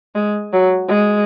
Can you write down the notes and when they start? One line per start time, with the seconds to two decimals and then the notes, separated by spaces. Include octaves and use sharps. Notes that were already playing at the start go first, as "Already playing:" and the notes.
0.15 G#3
0.53 F#3
0.89 G#3